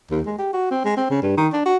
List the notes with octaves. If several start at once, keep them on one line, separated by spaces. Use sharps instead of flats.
D#2
G#3
G4
F#4
C4
G#3
C4
C#3
G2
D#3
D4
F#4